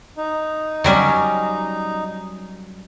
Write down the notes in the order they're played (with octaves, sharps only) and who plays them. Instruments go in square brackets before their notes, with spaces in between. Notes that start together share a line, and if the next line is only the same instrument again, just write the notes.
[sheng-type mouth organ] D#4
[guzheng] F#3 G3 C#4